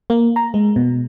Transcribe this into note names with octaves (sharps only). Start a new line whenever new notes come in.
A#3
A#5
G#3
B2